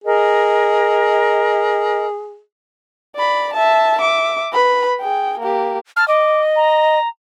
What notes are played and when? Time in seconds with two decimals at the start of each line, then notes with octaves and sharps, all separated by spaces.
0.04 G#4 A#4 D#5
3.16 D5 B5
3.53 E5 A5
3.99 E5 D6
4.53 B4 B5
5.01 G#4 G5
5.40 A#3 G4
5.96 A5 F6
6.08 D#5 D6
6.56 A#5